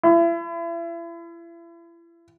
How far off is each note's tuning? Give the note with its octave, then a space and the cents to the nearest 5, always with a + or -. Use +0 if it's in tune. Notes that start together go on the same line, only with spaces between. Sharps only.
E4 +40